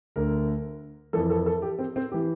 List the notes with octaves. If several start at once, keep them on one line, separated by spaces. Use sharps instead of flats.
D2 D3 A#4
F2 E3 A4
A4
A4
G4
C4
C4
E3 G4